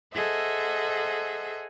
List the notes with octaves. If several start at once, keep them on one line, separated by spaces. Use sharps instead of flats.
G#4 A4 C5 D#5 E5 F#5